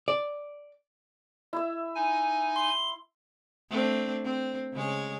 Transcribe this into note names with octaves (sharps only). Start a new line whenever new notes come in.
D5
E4 E5
D#4 G#5
C6 G7
A3 C4 D4
C4
C#3 G#3 C#5